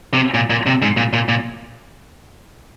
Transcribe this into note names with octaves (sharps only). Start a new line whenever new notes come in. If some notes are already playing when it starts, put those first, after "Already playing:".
C3
A#2
A#2
C3
G#2
A#2
A#2
A#2